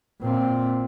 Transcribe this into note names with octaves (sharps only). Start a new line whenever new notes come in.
A#2 C4